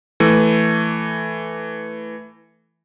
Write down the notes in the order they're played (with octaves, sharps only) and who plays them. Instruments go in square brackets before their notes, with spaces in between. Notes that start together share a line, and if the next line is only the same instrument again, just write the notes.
[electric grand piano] E3 A3